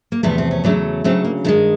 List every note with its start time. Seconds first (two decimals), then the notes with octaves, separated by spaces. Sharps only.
0.12 A#3
0.23 E2 C3 F3 A3 B3
0.38 C4
0.51 C#4
0.64 E2 C#3 F#3 A3 D4
1.04 D2 C#3 F#3 A3 C4
1.24 A#3
1.44 G2 D#3 G#3 A3